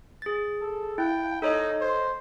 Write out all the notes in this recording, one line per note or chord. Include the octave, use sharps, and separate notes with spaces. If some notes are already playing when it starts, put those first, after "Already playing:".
G#4 A6
A4
E4 G5
D#4 A4 C#5 D#5
C5